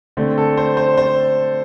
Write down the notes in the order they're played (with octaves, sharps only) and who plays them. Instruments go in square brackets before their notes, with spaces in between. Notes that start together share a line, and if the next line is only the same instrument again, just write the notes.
[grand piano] D3 A3 C4
A4
C5
C5
C5